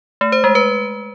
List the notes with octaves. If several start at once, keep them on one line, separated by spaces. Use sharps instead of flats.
A3
C5
G#3
B4